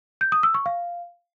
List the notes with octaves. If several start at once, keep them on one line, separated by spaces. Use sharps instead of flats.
G6
D#6
E6
C#6
F5